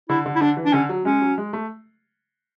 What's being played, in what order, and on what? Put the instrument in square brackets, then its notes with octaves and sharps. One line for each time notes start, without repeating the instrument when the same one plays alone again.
[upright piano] D3 [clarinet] E4
[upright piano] D3
[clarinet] E4
[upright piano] D3 [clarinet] D4
[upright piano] E3
[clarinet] D4
[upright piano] D3 [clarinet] C#4
[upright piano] F#3
[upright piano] G#3 [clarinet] C#4
[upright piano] F#3
G#3
A3